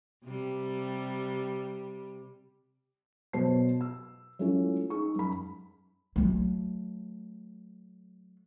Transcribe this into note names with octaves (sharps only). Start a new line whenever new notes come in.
C3 G3
B2 F#3 F#4 C5 A5 C7
E6
F#3 G#3 A3 C#4 E4 F4
D#4 G#4 C#6
F#2 B5
F#3 A3